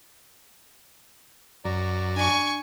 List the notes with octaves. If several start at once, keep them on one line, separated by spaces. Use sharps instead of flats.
F#2 D5 A#5
D4 G#5 C#6